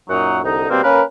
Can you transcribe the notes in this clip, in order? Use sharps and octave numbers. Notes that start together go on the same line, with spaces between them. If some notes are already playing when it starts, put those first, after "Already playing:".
F#2 A#2 F#3 D#4 F#5
C2 D3 D#4
B2 G3 A#3 C4
A#3 C#4 A#4 B4